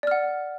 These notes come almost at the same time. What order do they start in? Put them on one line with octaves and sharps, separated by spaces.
D5 F6 F#5